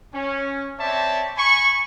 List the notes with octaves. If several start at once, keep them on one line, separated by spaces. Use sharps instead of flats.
C#4
C4 C#5 D5 E5 A5
G#5 B5 C#6